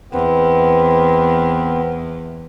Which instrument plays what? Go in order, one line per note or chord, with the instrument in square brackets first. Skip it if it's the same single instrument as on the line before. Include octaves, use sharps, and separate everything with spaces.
[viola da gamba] E2 [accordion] B3 C4